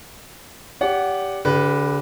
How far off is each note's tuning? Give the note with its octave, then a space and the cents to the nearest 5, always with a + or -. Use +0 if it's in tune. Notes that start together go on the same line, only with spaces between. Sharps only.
G4 +0 D5 -40 F#5 +0
D3 -40 G4 +0 B4 +0